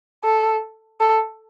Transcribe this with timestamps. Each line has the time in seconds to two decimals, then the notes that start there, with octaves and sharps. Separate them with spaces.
0.24 A4
1.01 A4